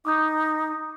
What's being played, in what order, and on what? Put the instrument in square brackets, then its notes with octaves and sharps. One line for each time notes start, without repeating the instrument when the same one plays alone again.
[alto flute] D#4 [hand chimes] D6 D#6 G6